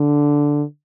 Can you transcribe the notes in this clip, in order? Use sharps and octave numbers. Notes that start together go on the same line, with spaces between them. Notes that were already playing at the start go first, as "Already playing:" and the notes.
Already playing: D3